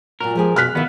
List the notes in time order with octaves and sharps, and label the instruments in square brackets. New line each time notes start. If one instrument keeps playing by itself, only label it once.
[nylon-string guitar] A#2 F#3 F#4 [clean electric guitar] A#4
[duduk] F3 [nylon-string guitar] G#3 G4 G#4
[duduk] B2 [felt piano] F6 F#6 B6
[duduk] D#3 [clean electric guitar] B3 E4 [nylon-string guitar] D#5 F5